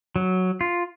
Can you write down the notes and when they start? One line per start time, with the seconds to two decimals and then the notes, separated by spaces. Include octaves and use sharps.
0.16 F#3
0.61 F4